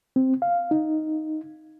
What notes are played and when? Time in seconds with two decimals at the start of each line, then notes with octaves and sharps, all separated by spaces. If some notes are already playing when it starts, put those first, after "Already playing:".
0.16 C4
0.42 F5
0.71 D#4